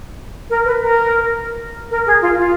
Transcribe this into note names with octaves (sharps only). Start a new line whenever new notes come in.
A#4
B4
A#4
A#4
G#4
F4
F4